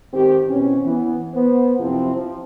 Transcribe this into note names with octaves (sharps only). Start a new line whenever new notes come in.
G#2 D#3 C4 G4
B2 E3 C4 C#4
E3 B3
B3 C5
F#2 C3 F3 C4 E4
F3